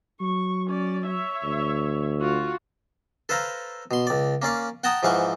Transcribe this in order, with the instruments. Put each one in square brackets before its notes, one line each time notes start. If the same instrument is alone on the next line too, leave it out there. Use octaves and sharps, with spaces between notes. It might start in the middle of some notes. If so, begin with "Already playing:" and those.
[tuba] F#3 [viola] C#6
[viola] C#4 D5
C#5 E5
[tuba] D2
[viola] F4 F#4
[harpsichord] A4 B4 C5 F5 A#5
B2 C6
C#2 D5
A#3 C#4 D5 F5
F#5 G5 A5 A#5 D#6
G#2 E3 F3 F5 F#5 C#6